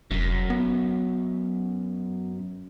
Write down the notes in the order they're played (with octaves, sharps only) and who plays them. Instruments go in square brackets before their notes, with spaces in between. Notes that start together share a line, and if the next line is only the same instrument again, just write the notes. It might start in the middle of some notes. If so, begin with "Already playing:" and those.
[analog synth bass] F1 [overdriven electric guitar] F#2
[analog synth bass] B3